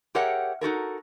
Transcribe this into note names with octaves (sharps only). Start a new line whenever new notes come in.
G4 G#4 A#4 C#5 E5 F#5
D#4 F#4 A4 A#4